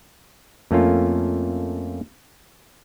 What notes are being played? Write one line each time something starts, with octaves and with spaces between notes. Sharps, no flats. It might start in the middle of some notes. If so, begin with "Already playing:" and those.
F2 A3 A#3 C#4 F4